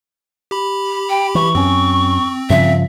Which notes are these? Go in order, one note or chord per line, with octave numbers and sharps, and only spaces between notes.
G4 B5
G5
E3 C#6
F#2 C4 C#4
G2 C#3 F3 E5